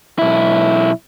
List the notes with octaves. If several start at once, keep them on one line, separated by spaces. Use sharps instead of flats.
B1 E4